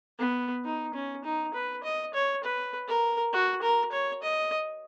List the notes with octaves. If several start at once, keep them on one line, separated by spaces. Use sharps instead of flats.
B3
D#4
C#4
D#4
B4
D#5
C#5
B4
A#4
F#4
A#4
C#5
D#5